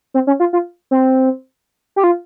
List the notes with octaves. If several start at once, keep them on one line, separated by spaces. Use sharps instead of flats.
C4
C#4
F4
F4
C4
G4
F4